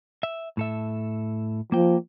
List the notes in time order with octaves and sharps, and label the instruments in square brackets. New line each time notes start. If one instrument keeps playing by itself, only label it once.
[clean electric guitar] E5
A2 A4 E5
[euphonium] F3 [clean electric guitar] A#3 G5